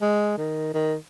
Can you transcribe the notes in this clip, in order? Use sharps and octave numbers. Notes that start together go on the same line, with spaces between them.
G#3
D#3
D#3